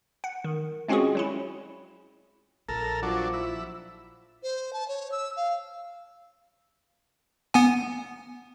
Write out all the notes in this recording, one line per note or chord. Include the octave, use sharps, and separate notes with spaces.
F#5
D#3
G#3 C4 C#4 F4 F#4 G#4
F#3 C#4 E4
A#1 A4 A#4
F3 F#3 D4
E4
C5
A5
C#5
E6
F5
B3 G#5